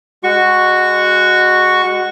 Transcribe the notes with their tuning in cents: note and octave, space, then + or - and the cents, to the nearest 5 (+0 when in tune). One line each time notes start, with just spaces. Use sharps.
G#3 -20 F#4 +0 C#6 +0